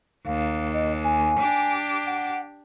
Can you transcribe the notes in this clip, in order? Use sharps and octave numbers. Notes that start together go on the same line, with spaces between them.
D#2 F5
D#5
G#5
D4 G4
F#5